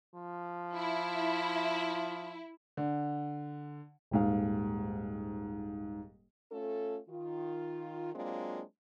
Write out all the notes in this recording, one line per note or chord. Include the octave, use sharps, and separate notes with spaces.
F3
E4
D3
D#1 G#2 F5
A3 C#4 F4 A4
D#3 F4
F#3 G#3 A#3 C4 D4 F4